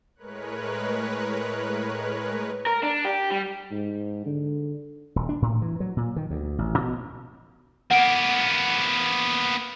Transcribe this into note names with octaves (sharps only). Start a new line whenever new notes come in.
A2 G#3 A#4 B4 C#5 F#6
A#4
D4
G4
G3
G#2
D3
D#1
D4
A2
E3
F#3
A#2
D#3
D2
A1
B2
A#3 B3 F#5 D7